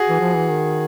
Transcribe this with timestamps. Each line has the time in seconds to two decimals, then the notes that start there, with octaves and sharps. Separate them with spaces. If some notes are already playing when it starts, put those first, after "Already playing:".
Already playing: F#4 G#4
0.09 E3
0.20 F3
0.35 E3
0.49 D#3